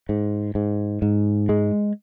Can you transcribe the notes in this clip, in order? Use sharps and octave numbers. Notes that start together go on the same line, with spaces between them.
G#2
G#2
G#2
G#3